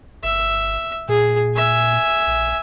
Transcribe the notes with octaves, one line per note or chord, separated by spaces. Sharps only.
G1 E5
A#2 G#4
E5 G#5
A#1